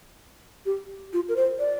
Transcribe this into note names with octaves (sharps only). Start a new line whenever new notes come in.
G4
F4
A#4
C5
D5